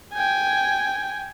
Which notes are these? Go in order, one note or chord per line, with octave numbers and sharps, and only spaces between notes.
G5 G#5